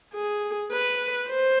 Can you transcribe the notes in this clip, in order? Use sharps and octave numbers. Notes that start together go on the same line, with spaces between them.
G#4
B4
C5